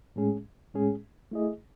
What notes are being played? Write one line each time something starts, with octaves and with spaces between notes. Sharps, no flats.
A2 G#3 C#4 G#4
A2 G#3 C#4 G#4
A3 E4 G#4 D#5